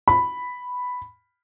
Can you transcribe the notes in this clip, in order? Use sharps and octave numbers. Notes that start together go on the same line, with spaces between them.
B5